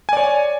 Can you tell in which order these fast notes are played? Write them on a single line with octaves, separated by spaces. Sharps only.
G#5 D5 C#5